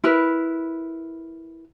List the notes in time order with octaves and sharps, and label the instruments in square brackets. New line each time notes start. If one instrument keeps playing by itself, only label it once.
[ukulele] E4 A#4 B4